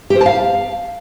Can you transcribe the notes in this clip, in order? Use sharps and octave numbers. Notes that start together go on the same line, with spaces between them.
G4
C5
A5
F5